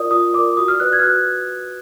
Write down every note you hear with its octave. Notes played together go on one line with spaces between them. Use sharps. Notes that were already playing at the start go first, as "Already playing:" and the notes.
Already playing: F4 A#4 D5 D#6
F4 D#6
A#4 D5 D6
F#4 D#6
F6
B4 D5 F#6
G#6
F6
F#4 F#6